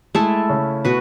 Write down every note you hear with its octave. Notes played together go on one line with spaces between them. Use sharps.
G#3 A3 E4 G#4 A4
C#3 C#4
B2 B3 F#4 B4